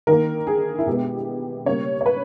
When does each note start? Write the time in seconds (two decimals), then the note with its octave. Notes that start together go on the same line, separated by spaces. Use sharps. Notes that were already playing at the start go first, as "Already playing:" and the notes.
0.07 D#3 A#3 A#4
0.47 G#4
0.78 E4
0.86 B2 G#3 B3 G4
1.65 C#3 G3 A#3 C#5
2.01 C#5
2.06 B4